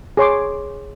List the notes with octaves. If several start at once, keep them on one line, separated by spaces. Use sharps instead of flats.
G#4 C#5 C6 D6